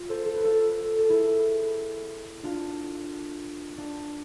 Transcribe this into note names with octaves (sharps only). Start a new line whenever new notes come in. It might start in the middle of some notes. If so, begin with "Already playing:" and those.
Already playing: F4
A4 C5
A4
B4
F4 A4
A4
E4 G#4
D4 F4
D4